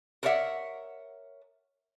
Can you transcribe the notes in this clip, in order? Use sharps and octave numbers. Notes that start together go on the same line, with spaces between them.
A#4 B4 C#5 D5 E5 F#5